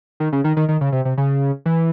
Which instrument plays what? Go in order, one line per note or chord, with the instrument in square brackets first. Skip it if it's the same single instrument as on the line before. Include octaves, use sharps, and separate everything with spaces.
[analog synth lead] D#3
C#3
D#3
D#3
D#3
C#3
C3
C3
C#3
E3